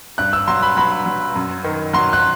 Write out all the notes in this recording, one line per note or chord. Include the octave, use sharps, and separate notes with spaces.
G2 F#6
E6
F#3 C6
B5
F#3 B5
F#3
F#2
D#3
F#3 C6
F#6